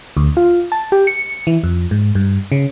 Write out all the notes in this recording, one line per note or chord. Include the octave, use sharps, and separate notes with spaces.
D2
F4
A5
G4
C#7
E3
F2
G#2
G2
C#3